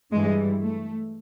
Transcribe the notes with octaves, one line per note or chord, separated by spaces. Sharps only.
G2 E3 G3 G#3
A3